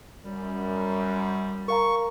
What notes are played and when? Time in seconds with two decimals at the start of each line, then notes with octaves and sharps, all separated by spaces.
0.25 F#2 G3
1.68 A#4 F5 A#5 C#6